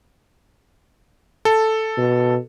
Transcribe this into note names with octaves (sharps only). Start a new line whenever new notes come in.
A4
B2